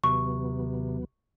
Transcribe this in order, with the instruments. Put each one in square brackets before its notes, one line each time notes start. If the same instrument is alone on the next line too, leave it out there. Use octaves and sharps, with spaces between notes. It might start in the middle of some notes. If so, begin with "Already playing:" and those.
[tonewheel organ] D#2 F#3 B3 [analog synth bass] C3 [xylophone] C#6